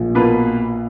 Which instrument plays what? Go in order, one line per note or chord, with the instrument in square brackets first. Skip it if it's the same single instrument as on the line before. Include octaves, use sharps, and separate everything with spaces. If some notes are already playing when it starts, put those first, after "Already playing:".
Already playing: [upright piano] A#1 A#2
[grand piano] B2 A#3 F4 B4